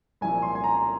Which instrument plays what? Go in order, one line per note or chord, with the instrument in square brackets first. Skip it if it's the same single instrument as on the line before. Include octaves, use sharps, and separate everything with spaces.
[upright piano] C2 A#2 F3 G#5
C6
G#5
A#5